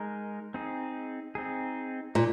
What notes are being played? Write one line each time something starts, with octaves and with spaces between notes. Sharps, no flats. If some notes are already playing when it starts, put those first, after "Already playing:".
Already playing: G#3 D#4 A#4
C4 D#4 G#4
C4 D#4 G#4
A#2 G#3 D#4